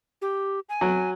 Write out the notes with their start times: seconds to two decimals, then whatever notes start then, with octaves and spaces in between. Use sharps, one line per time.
0.22 G4
0.69 G#5
0.81 F#3